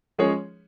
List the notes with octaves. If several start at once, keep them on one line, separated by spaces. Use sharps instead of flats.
F3 G#3 C#4 G#4 C#5